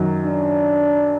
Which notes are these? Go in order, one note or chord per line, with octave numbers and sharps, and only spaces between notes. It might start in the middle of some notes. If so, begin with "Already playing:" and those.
Already playing: F#2 D#3 F#3
D4